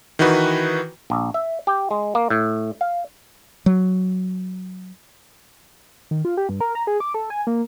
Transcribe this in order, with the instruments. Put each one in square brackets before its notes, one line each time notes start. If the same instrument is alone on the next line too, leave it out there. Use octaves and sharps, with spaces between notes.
[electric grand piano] D#3 E3 D#4 F#4 B4
[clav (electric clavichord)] A#1
E5
G4
G#3
A#3
A2
F5
[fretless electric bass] F#3
[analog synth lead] D#3
F4
G4
G2
A#4
A#5
G#4
D6
A4
G#5
A#3